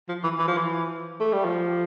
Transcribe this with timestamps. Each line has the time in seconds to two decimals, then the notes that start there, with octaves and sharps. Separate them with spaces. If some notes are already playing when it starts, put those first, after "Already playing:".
0.09 F3
0.24 E3
0.39 E3
0.48 F3
0.57 E3
1.20 A3
1.33 G3
1.45 F3